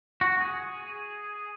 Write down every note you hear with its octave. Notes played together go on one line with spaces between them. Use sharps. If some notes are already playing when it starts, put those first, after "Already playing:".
F#4
G#4